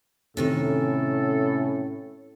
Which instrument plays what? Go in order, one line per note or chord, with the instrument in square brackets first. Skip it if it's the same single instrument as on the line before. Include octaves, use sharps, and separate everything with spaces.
[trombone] A2 [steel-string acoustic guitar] C3 D#3 A#4 [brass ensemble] C#4 [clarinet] A4